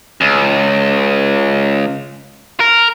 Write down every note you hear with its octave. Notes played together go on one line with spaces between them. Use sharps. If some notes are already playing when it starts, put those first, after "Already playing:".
C#2
A#4